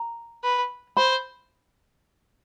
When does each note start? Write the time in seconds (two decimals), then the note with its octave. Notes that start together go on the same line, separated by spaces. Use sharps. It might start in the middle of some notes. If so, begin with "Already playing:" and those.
Already playing: A#5
0.44 B4
0.97 C5 B5